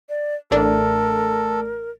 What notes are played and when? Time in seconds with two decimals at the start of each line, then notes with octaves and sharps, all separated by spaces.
0.09 D5
0.51 A1 A3 D4 A4 A#4 D5